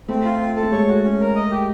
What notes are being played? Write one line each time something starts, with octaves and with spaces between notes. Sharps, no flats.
A3 C4
F4
C4
A4
A3
G#3 C#5
F#4
C#4
A#4
D#5
G4